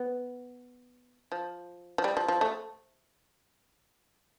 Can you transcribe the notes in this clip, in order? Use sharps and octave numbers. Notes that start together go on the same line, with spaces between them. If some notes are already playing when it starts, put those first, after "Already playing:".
Already playing: B3
F3
F3
G3
F3
F3
A3